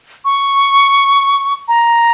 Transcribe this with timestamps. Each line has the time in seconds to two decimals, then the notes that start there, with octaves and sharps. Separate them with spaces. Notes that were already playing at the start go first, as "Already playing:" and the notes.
0.25 C#6
1.68 A#5